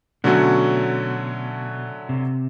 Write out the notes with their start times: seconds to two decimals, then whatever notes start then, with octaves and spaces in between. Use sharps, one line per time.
0.24 B2 D3 F#3 A3 C#4 F#4
2.09 C3